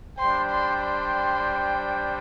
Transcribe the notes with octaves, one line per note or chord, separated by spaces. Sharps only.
G3 D4 C5 G5 C6
C6
C6